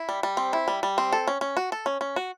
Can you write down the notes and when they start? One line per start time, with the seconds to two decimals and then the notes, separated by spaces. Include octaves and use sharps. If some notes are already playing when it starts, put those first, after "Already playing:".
Already playing: E4
0.09 G3
0.23 G3
0.37 C4
0.53 E4
0.68 G3
0.83 G3
0.98 C4
1.13 A4
1.27 C#4
1.41 C#4
1.57 F#4
1.72 A4
1.86 C#4
2.01 C#4
2.16 F#4